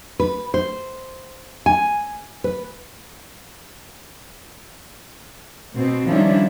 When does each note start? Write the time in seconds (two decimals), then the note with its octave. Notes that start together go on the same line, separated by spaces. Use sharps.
0.20 B4
0.54 C5
1.66 G#5
2.44 B4
5.76 B2 C4
6.08 D#3 F3 G3 C#4 D4 E4